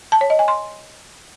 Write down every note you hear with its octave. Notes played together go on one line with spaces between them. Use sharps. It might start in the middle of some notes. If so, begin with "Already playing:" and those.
A5
C#5
D#5
G#5
C6